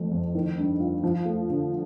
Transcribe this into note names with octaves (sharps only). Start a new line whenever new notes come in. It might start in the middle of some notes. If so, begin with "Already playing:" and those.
Already playing: F2 A3
F2
D#3
G2
F4
F3
A3
D3